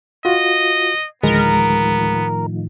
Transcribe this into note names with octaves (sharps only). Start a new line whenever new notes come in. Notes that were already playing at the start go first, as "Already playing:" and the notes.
F4 F#4 D#5
D2 A2 D#3 F3 G#3 B3 A#4